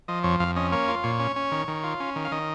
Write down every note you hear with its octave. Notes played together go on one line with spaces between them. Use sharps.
F3 D#5
F2 C#5
F2 F5
C#4 D#5
A#3 C#5
F4
A#2 C#5
C#4
C#4
D#3
D#3
F4
C#4
D#3
F5
D#3 D#5